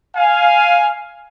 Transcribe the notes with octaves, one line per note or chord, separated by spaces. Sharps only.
F5 G#5